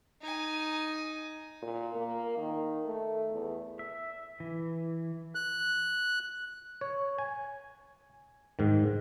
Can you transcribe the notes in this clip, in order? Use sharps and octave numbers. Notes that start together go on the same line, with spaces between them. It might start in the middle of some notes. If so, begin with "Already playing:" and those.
D#4 G#5
A#2
A#3
D#3
A3
E2
E5
E3
F#6
C#5
G#5
G#2 D#3